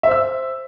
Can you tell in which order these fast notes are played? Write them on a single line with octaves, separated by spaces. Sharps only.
E5 C5 E6